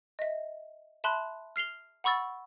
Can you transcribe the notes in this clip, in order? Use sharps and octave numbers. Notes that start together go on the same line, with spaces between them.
D#5 E5
E5 A5 B5 C6 F#6
F6 C7 F7 G7
F#5 B5 C#6 E6 A6